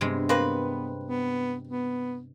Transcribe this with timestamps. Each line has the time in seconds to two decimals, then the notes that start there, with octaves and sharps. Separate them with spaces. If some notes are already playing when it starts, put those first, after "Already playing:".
0.01 G2 C3 G#3 B3
0.29 A#3 C4 B4
1.03 B3
1.67 B3